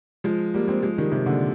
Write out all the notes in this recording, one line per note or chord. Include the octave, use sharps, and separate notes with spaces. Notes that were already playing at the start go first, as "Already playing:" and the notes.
F3 G#3
G3 A#3
G#3 C4
F3 G#3
D#3 G3
C3 D#3
A#2 D3